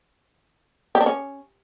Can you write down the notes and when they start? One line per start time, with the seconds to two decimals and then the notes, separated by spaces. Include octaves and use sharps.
0.95 G4
1.01 D4
1.06 C#4